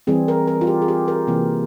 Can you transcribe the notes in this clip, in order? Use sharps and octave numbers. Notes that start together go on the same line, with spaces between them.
E3 G3 C4 G#4
A#4
A#4
F4
G4
G#4
G4
A#4
C3 E3 A#3